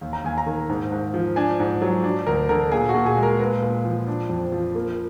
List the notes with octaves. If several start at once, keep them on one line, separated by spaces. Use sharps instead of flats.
D#2
A#5
D#2 G#5
A#5
D#3
G#2
G#2
F3
D4 G#5
G#2
F#3
D4
D2 A#4
D3 A#4
A#2 G#4
F#4
A#2
G#4
G#3
A#4
A#2 B4
A#2
F3
D4
F2
F3
A#3